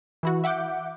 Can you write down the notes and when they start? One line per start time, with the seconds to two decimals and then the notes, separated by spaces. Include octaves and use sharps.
0.23 E3 E4 F#4
0.44 E5 F#5 D6 G6